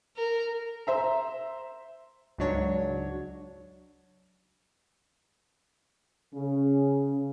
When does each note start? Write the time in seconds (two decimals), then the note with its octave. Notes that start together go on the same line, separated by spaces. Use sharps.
0.17 A#4
0.87 C5 E5 A#5
2.38 C#2 G#2 F#3 D4 C#5
6.34 C#3 C#4